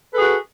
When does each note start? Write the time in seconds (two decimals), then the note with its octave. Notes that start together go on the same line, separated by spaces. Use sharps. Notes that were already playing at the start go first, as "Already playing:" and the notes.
0.10 B4
0.14 A4
0.17 G#4
0.21 F#4